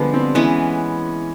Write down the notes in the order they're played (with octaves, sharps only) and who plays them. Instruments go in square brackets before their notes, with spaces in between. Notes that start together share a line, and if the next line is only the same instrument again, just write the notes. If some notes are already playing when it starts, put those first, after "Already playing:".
Already playing: [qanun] D3 F3 G#3 [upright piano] G3 B3
[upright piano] C4
[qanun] E3 G#3 B3 [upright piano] C#4